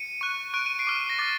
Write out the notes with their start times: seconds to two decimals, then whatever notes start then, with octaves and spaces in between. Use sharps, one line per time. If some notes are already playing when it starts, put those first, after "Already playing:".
Already playing: C#7 D#7
0.21 C#6 F#6
0.54 C#6 F#6 D7
0.66 D#7
0.79 C7 D7
0.87 D6 F6
1.10 A#6
1.19 D6 F6 A6